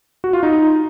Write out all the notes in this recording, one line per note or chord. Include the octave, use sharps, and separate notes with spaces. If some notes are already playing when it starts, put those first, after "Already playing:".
F#4
F4
D#4